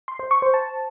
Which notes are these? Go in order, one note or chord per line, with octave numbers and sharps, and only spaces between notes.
C6
C5
C#6
C5
A5